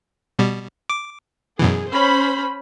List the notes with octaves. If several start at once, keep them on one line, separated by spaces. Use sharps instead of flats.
B2 G3
D6
F#2 B2 E3 G#4
C#4 C5 B5